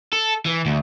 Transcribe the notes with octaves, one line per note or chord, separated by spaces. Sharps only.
A4
E3
D2